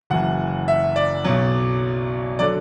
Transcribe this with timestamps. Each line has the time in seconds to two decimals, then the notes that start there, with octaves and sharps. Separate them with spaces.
0.10 F#1 F#2 E3 F#5
0.68 E5
0.96 D5
1.24 B1 B2 F#3
2.39 D3 F#3 D5